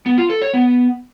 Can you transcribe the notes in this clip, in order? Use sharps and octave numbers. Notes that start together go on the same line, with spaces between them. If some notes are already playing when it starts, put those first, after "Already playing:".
B3
F4
A4
C#5
B3